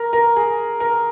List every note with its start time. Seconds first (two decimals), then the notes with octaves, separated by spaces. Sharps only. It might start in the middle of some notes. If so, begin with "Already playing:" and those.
Already playing: A#4
0.13 A#4
0.36 G#4
0.80 A#4